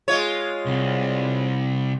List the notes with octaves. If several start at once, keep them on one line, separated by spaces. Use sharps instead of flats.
G#3 F4 C#5
C2